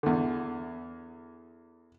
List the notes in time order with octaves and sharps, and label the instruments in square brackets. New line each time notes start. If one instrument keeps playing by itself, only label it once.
[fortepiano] E2 D3